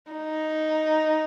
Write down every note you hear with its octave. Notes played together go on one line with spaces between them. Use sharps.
D#4